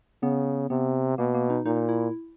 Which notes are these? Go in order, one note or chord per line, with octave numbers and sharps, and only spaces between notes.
C#3 B3
C3 B3
B2 A#3
A#3
D#4
A#2 D#4
E4